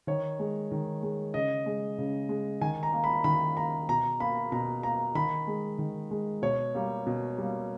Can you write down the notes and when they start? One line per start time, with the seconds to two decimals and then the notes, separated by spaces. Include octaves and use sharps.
0.07 D#3 C#5
0.39 G#3
0.72 D#3
1.03 G#3
1.34 C#3 D#5
1.66 G#3
1.98 C#3
2.29 G#3
2.61 D#3 G#5
2.83 A#5
2.93 A#3
3.04 B5
3.24 D#3 B5
3.56 A#3 A#5
3.89 B2 A#5
4.20 A#3 B5
4.52 B2 A#5
4.83 A#3 A#5
5.15 D#3 B5
5.47 G#3
5.79 D#3
6.11 G#3
6.42 B2 C#5
6.74 G3 A#3
7.07 B2
7.38 G3 A#3